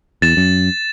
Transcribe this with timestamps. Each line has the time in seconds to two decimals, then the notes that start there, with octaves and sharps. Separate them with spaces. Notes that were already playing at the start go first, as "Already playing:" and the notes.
0.22 E2 A6 E7
0.37 F#2